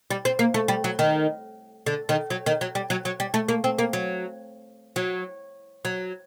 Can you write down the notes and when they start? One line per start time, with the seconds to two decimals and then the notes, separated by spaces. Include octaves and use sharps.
0.10 G3
0.25 C4
0.39 A#3
0.54 A3
0.68 G3
0.84 F#3
0.99 D#3
1.86 D3
2.09 D#3
2.30 F#3
2.46 D#3
2.61 F#3
2.75 G3
2.90 F#3
3.05 F#3
3.20 G3
3.34 A3
3.48 A#3
3.64 C4
3.79 A#3
3.93 F#3
4.96 F#3
5.85 F#3